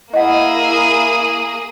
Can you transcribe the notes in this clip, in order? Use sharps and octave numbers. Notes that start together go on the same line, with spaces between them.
A#3 E4 G#4 D#5 F#5